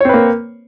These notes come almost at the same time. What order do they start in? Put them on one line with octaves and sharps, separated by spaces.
C#5 C4 B4 A#3